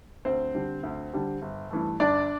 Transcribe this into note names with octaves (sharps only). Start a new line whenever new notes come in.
D2 C4 C5
D3 G3
D2
D3 G3
G1
G2 E3 A3
G1 D4 D5